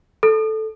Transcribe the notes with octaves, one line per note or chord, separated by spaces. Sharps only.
A4